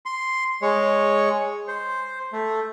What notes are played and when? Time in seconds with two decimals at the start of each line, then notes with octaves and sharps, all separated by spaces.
0.06 C6
0.62 G#3 C#5
1.68 C5
2.33 A3